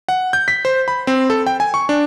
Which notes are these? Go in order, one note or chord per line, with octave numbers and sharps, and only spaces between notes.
F#5
G6
B6
C5
B5
C4
A4
G5
G#5
C#6
D4